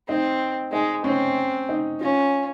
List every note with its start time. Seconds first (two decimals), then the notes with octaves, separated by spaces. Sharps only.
0.08 C4 D#4
0.72 G#3 D#4
1.04 C4 C#4
1.69 D#4
2.00 C#4 F4